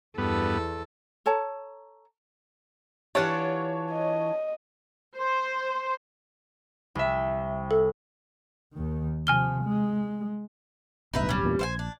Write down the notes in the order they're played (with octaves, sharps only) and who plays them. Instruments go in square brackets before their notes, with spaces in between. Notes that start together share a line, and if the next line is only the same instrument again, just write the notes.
[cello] E2 A4 [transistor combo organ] G2 B3
[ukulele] A4 C#5 A5 A#5
[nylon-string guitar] E3 G4 [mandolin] D4 F4 F#5 [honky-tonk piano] C#5
[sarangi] D#5
[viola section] C5
[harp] C2 E5
[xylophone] A4
[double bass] D#2 D#3
[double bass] C3 F3 [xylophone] G#5 F6 G7
[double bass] G#3
[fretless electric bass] D1 B1 G2 [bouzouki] D#4 B4 E5
[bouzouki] G3 C#4
[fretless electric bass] E2 G2 A#2
[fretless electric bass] A#1 [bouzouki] C5 F5 G#5
[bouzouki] D4